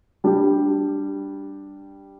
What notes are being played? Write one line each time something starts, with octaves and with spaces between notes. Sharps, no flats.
G3 D4 G4